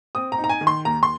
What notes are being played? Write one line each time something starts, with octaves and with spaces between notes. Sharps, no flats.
C4 D#6
A#5
D#4
A#5
G#5
D#3
C6
D#2 A#5
C6